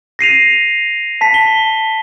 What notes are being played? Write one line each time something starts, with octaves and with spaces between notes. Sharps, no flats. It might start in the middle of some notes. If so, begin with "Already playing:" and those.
A#6 C7 D#7 F7
A5 B6
G7